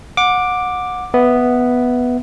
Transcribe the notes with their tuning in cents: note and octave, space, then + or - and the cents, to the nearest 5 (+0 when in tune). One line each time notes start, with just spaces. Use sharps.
F#5 -25 D6 +5
B3 +0 E5 +0